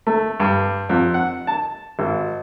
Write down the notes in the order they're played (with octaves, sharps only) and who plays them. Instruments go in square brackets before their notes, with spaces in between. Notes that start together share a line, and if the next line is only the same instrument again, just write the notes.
[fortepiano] A3
G2
F2
F#5
A5
G#1